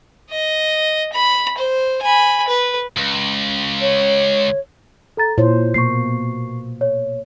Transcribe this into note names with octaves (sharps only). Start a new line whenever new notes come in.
D#5
B5
C5
G#5 B5
B4
C#2
C#5
A4 A#5 A6
A#2 E4 F4 C5 C#5
B2 A#3 C#6 C7
C#5